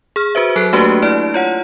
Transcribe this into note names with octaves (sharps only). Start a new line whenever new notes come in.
G#4 F6
F#4 B4 C5 E5
F#3 A4 F#6 C7 D7
A3 A#3 D4 F#4 G4 B4
E4 D5 F6 D7
F4 C#5 F#5